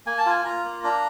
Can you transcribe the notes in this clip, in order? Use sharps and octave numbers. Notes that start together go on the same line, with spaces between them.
A#3 G#5
A5
F4 G#5
F4 A#5
A#3
D4 A#5